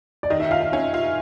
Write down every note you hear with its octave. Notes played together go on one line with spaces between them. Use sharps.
D5
D#3 D#5
E5
F4 F5
F5
C#4 E5
F4 E5